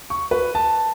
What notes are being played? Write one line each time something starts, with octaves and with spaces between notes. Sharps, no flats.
C#6
B4
A5